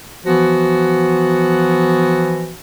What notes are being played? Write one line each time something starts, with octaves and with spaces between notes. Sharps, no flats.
E3 F3 B3 F#4